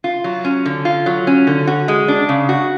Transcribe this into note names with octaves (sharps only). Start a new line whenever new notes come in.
F4
F#3
C#4
D3
F4
F#3
C#4
D3
F#4
G#3
D4
C#3
F#4